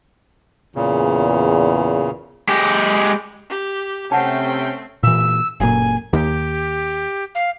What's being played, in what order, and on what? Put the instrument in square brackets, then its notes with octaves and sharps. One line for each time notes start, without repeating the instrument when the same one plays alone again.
[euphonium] E2 [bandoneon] A#2 C#3
[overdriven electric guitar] G#3 G4
[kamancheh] G4
[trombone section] C3 [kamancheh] A3 C4 [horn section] C#4 G5 [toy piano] F#5 A5
[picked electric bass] A#2 E3 [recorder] E6
[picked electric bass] F#1 A#2 [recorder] G#5
[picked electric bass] D#2 [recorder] G4
[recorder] F5